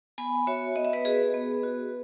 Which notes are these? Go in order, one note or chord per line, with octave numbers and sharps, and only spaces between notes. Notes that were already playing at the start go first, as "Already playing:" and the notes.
B3 G#5 B5
F#4 C#5 E5
B3 D#5
E5
B4 D#5
F#4 G#4 B4
B3
F#4